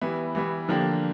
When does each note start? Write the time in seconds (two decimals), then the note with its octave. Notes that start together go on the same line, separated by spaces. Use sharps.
0.01 E3 G3 B3 E4
0.35 E3 G3 B3 E4
0.69 D3 F3 A#3 D4 G4